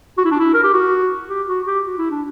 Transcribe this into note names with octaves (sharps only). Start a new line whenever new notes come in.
F#4
E4
D4
E4
A#4
G4
F#4
G4
F#4
G4
F#4
E4
D4